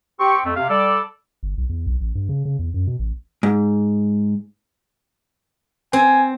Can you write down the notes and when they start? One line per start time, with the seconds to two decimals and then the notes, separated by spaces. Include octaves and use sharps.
0.19 C4 G4 C#6
0.45 F2 A3
0.56 C3 F5
0.70 G3 A4 D5
1.43 G1
1.58 B1
1.69 E2
1.87 B1
2.01 A1
2.15 G2
2.29 C#3
2.45 C#3
2.59 E2
2.74 F#2
2.87 B2
2.99 A1
3.43 G#2
5.93 C4 G#5